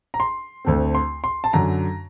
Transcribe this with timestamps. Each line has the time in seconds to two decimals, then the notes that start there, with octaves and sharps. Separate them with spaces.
0.14 A#5
0.20 C6
0.65 D2 D3 A3 C4
0.95 C6
1.24 C6
1.44 A5
1.53 F#2 D3 F#3 A#5